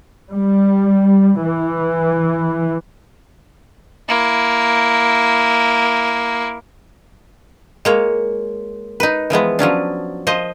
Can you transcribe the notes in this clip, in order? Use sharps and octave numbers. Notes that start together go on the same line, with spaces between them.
G3
E3
A#3 E4
G#3 A#3 C#5
D#4 B4
E3 F3 G#3 B3
F3 F#3 C#4 D4
F3 C5 D#5